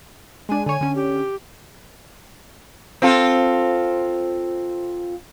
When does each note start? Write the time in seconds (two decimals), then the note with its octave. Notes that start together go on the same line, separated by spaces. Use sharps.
0.49 G#3 D4 G#5
0.66 D3 C#5 G#5
0.81 D3 C#4
0.95 G4
3.02 C4 F4 A4